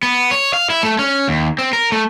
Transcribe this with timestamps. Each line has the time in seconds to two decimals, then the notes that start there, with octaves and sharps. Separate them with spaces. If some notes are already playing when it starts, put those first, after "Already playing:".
0.03 B3
0.31 C#5
0.53 F5
0.70 E4
0.83 A3
0.99 C#4
1.28 D#2
1.59 C4
1.73 A#4
1.92 A3